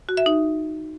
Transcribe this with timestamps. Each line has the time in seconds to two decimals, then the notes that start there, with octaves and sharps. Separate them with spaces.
0.09 F#4
0.17 E5
0.26 D#4